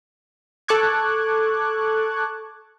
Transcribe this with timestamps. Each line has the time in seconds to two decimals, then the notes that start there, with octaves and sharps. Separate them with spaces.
0.68 A4 A5 C#6 D6 F#6 G#6